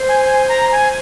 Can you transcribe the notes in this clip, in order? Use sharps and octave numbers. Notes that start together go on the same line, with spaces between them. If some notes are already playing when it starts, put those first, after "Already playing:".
Already playing: C5
G#5
G#5
A#5
G#5